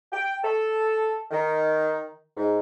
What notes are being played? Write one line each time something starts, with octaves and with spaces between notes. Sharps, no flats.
G5
A4
D#3
G#2